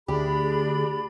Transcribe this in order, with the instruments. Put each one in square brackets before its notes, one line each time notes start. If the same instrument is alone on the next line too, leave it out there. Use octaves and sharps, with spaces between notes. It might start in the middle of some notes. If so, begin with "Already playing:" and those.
[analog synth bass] D2 [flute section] D4 B5 [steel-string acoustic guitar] G4 [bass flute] G#4